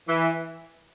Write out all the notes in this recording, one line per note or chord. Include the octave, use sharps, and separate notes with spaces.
E3